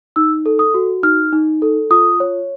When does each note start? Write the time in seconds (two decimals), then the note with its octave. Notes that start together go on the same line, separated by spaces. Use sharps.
0.16 D#4 E6
0.46 A4
0.59 D#6
0.74 F#4
1.03 D#4 F6
1.33 D#4
1.62 A4
1.90 F4 D#6
2.20 C#5